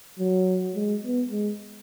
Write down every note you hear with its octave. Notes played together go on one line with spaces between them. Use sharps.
F#3
G#3
B3
G#3